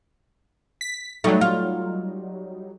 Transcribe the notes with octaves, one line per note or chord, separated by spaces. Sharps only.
B6
F#3 G3 A3 D#4
F4